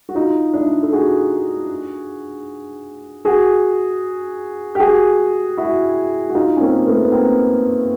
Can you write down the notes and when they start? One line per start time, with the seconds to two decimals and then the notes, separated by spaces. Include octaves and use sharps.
0.09 F#4
0.15 D#4 F4
0.53 D4 E4
0.83 A4
0.92 F#4 G#4
3.25 F#4 G#4
4.75 G4
4.79 F#4 G#4
5.57 E4 F#4
6.30 F#4
6.35 D#4 F4
6.57 C#4
6.61 A#3 C4
6.86 A3 B3
7.04 B3
7.12 A#3 C4